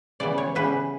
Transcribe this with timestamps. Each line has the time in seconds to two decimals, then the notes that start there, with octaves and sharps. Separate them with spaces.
0.20 C#3 E3 G3 B3 D5
0.38 C#5
0.55 C#3 E3 G3 B3 B4